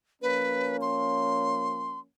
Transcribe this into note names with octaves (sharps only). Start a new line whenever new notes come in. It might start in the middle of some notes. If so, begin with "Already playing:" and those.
F3 A#3 C#4 B4
C6